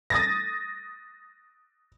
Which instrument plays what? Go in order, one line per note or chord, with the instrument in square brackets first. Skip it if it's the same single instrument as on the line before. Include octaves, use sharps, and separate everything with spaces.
[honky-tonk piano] D#6 A6 A#6